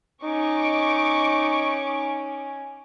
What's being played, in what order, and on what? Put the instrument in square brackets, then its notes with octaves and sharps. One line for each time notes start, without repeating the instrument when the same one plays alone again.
[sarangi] C#4 [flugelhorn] D#4 [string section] C#6 D6